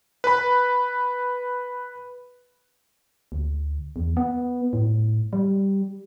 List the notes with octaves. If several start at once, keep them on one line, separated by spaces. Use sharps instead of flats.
B4 B5
D2
E2
B3
A2
G3